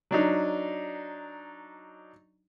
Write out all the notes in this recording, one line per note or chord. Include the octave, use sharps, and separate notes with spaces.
F#3 D4 D#4